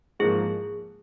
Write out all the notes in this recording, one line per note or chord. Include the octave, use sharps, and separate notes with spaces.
G#2 F3 A#3 G#4